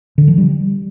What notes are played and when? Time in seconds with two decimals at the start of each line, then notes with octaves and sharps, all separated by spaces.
0.18 D3
0.28 F3
0.38 G3